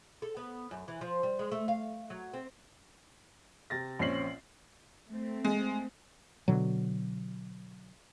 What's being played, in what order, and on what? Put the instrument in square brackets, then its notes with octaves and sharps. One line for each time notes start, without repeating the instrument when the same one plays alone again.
[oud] A4
B3
F#2
E3
F3
G3
G#3
A3
F5
F#3
C4
[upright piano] C3 A6 A#6
A#1 C4 C#4 C7 F#7
[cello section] A3 C4
[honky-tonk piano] G#3
[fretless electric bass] B2 D3 F#3